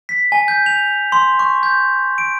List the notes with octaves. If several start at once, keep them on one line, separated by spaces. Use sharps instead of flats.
B6
G#5
G6
F7
C6
C#6
G6
D7